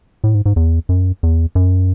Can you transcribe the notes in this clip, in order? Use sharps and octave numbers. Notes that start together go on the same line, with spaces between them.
A2
G#2
G#2
E2
F#2
E2
F#2